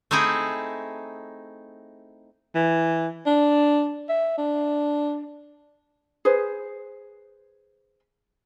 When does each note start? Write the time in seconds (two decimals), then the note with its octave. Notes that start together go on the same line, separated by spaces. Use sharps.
0.11 A3 C4 D#4 E4 G#4
2.55 E3
3.26 D4
4.09 E5
4.38 D4
6.25 G#4 B4 C5